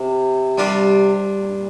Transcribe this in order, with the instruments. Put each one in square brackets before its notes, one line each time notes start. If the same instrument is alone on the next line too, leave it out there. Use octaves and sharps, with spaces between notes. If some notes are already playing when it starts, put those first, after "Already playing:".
Already playing: [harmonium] C3
[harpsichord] D3 G3 D4 F4
[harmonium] A#2
G2
A#2